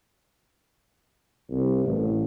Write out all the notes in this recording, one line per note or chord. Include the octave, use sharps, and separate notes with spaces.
C2
A1